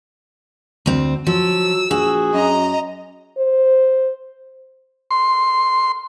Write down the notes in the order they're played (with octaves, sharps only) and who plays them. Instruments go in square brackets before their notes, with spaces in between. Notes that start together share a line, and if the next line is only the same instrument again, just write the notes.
[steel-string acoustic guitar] D2 C4
[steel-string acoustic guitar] F3 [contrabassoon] F#3 [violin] E6
[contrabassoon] A#1 [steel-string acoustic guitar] F#4 [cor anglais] G#4
[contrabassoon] F#2 [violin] D#5 A#5
[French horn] C5
[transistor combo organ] C6